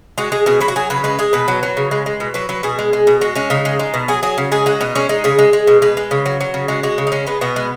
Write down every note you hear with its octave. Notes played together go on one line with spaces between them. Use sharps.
G#3 F#4
G#3 G#4
B2 G#4
F#3 B4
F#4
F#3 G#4
C#3 B4
G#3 B4
G#3 G#4
B2 B4
F#3
F#3
C#3
G#3
G#3
B2
F#3 B4
F#3 B4
B2 G#4
G#3
G#3
B2
G#3 F#4
G#3 C#4
C#3 D#4
G#3
G#3
B2
F#3 G#4
F#3 G#4
C#3
G#3 G#4
G#3 F#4
B2 D#4
G#3 C#4
G#3 D#4
C#3 G#4
G#3
G#3
B2
G#3 B4
G#3
C#3
F#3
F#3
C#3
G#3 F#4
G#3 F#4
C#3
D#4
G#3 C#4
G#3 B3
B2 B3
G#3